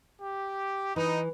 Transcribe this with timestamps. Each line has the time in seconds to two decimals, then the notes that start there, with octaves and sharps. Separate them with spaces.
0.22 G4
0.96 E3 D#4